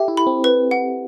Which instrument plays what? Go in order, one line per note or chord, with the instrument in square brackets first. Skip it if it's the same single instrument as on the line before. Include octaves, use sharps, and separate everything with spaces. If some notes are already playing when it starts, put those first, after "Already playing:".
Already playing: [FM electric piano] G4 A4 [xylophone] E5
[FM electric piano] E4
[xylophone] B5
[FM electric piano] C4
[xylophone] B4
F#5